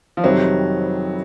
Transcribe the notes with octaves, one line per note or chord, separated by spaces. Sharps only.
F3
F2 C3 D#3 F#3 G3 C4